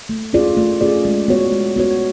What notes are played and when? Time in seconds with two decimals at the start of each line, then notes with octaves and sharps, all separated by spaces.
0.09 A3
0.33 C#4 F4 G#4 D5
0.57 A3
0.81 C#4 F4 G#4 D5
1.05 G#3
1.28 B3 F#4 C#5
1.52 G#3
1.76 B3 F#4 C#5